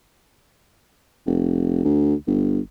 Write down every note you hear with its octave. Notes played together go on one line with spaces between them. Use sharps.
F1
D2
G1